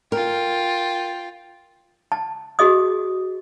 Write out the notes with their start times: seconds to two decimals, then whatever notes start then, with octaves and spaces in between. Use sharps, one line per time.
0.12 F4 A#4 G5
2.12 A5
2.59 F#4 G#4 D#5 D#6